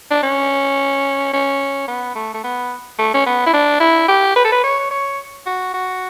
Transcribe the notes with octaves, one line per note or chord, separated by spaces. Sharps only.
D4
C#4
C#4
B3
A3
A3
B3
A3
C#4
B3
E4
D4
E4
G4
B4
A4
B4
C#5
C#5
F#4
F#4